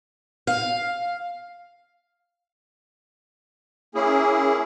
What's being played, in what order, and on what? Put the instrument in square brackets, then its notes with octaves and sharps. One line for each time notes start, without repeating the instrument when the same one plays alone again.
[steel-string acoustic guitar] F5
[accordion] A#3 C#4 E4 G#4